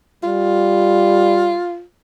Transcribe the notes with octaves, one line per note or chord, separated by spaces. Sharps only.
G3 F4